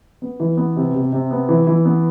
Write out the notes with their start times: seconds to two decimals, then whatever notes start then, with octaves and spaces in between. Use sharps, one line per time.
0.22 B3
0.40 E3
0.57 B3
0.76 C3
0.94 C3
1.13 C3
1.31 B3
1.49 E3
1.67 E3
1.85 B3